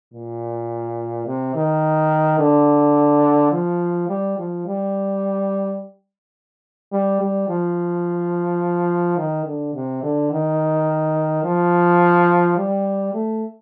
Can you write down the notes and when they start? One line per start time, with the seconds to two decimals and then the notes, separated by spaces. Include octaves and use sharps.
0.14 A#2
1.27 C3
1.55 D#3
2.39 D3
3.52 F3
4.09 G3
4.38 F3
4.67 G3
6.92 G3
7.21 G3
7.49 F3
9.18 D#3
9.46 D3
9.74 C3
10.03 D3
10.32 D#3
11.44 F3
12.58 G3
13.14 A3